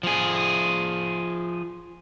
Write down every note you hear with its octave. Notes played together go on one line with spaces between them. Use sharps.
F3 G#4